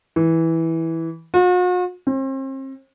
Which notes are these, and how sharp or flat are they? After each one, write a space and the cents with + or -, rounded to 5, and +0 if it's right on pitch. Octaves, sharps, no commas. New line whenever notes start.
E3 -10
F#4 -45
C4 +40